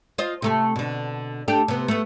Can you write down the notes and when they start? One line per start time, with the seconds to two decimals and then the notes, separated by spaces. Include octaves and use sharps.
0.18 F4 C5 D#5
0.42 C3 A3 A4
0.76 B2 D3
1.48 A3 D4 G4
1.68 C3 B3
1.88 A3 B3